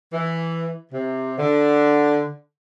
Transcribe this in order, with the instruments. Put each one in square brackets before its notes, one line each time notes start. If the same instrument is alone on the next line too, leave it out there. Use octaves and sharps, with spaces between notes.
[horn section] E3
C3
D3